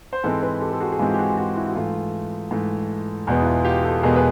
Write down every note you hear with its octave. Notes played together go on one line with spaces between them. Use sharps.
C5
G#2 E3 G#3 C4 A4 B4
A4 B4
G4 A4
A4
F#4 G#4
G#4
G#2 E3 G#3 C4 F4 G4
G4
F#4 G#4
F#4 G#4
E4 F#4
F#4
G#2 E3 A3 F4
G#2 E3 A3
E2 B2 G#3 B3
E4
F4
F4 G4
G4 A4
E2 B2 G#3 B3 G#4 A#4
B4